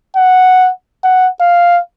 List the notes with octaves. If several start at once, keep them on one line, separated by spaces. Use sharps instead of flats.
F#5
F#5
F5